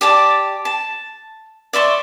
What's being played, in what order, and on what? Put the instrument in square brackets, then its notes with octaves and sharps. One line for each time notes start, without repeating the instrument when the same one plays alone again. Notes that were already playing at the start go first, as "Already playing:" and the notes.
[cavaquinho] G4 D5 A5 D6
A5
D5 E5 C6 C#6